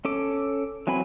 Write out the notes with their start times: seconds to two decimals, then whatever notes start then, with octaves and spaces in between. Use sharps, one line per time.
0.05 C#4 A4 D6
0.87 E3 F#3 C4 G#5 B5